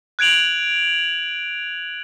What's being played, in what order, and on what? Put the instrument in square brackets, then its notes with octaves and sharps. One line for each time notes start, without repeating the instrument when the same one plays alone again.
[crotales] F#6 G#6 D7 F7 F#7